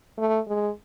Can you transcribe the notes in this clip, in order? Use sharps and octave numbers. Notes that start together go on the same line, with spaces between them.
A3
G#3